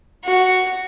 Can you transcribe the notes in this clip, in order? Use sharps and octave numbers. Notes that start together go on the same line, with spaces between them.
F#4